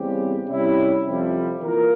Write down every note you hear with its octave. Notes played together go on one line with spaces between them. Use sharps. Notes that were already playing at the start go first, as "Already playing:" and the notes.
Already playing: E2 C#3 G3 C4 G4
C3 G3 C#4 E4
F2 C3 G3
E3 A#3 F4 A#4